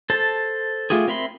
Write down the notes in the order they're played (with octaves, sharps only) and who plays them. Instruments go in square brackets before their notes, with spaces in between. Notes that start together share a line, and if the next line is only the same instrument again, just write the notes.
[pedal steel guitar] A4 C5 A5
A3 F4 G4 G#4
C4 A#4 E5 B5 C6